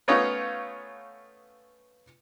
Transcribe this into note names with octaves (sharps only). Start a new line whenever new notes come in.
A3 B3 C#4 D#4 F4 C#5